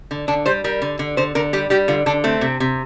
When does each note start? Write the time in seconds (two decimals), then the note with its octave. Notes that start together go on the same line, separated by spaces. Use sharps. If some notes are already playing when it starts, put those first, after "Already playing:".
0.11 D3
0.28 D3 D4
0.46 G3 C5
0.64 G3 A#4
0.82 D3
0.99 D3
1.17 D3 C5
1.35 D3 A#4
1.53 G3 G4
1.70 G3 G4
1.88 D3 F4
2.06 D3 D4
2.24 A3 C4
2.41 C3
2.60 C3